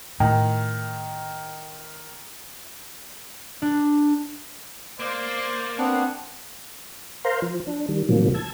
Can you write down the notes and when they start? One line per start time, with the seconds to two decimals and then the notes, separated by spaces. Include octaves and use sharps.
0.20 A2 D#3
3.62 D4
5.00 A#3 C5 D5
5.79 B3 C4 D4 F#5
7.24 A#4 C5 F5 A#5 C6
7.42 F3
7.67 D4
7.88 D#3 G3
8.09 A2 C3 D#3 F3 F#3 A#3
8.34 A5 E6 G#6